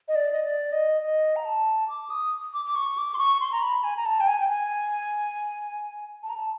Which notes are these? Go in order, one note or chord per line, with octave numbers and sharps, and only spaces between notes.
D#5
D5
D#5
D5
D#5
D#5
A#5
A5
D6
D#6
D6
D6
C#6
D6
C6
C#6
C6
A#5
B5
G#5
A#5
A5
G5
G#5
G5
G#5
A5
A#5
A5